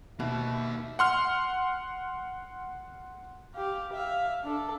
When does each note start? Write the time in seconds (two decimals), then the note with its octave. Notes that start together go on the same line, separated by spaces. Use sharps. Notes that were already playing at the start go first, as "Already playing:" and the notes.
0.20 B2 A#3 D#4 E5
0.99 F#5 C6 F6
3.54 G4 F5
3.93 E5 F5
4.43 D4 A4